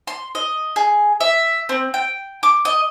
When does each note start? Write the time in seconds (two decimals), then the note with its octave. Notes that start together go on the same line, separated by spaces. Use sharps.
0.07 C6
0.35 D#5
0.76 G#4
1.20 E5
1.69 C4
1.94 G5
2.43 D6
2.65 D#5